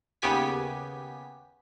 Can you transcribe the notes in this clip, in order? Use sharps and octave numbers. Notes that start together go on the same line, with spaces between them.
D#2 C#3 B3 G4 G#5 B6